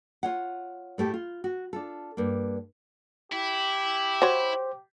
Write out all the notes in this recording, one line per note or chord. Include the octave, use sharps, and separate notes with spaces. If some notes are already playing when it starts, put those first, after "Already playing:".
F4 C#5 F#5
A2 A3 G4 A4
F4
F#4
D4 F4 A4
G2 A#3
E4 G4
F#4 C5 C#5